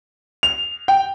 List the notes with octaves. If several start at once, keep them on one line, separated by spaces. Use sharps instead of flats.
F7
G5